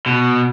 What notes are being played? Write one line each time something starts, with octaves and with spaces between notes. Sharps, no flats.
B2